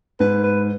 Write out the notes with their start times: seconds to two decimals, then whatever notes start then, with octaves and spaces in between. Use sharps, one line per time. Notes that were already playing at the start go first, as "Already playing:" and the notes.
0.20 G#2 B4
0.44 B4